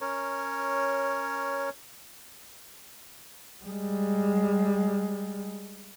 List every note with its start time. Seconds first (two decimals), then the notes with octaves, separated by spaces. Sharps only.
0.01 C#4 A#4 C#5
3.65 G3 G#3